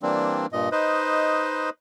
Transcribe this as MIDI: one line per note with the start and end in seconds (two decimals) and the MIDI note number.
0.03 0.46 52
0.03 0.46 55
0.03 0.46 58
0.03 0.46 60
0.03 0.46 62
0.53 0.69 43
0.53 0.69 46
0.53 0.69 75
0.72 1.70 63
0.72 1.70 71
0.72 1.70 72
0.72 1.70 75